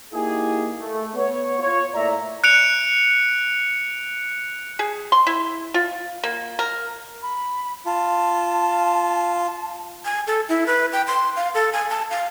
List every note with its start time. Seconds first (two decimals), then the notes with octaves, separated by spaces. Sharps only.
0.13 A#3 D#4 E4 G4 G#4
0.79 A3
1.15 B3 C#5
1.59 F4 C#5
1.94 A2 A#3 D5 E5 A#5
2.44 F#6 C#7 D7 F7
4.79 G#4
5.12 C6
5.27 E4
5.74 F4
6.24 A#3
6.59 A#4
7.23 B5
7.86 F4 A5
10.05 G#5
10.27 A4
10.49 E4
10.67 B4
10.93 G5
11.07 C6
11.36 F5
11.55 A4
11.73 G#5
11.90 A5
12.11 F5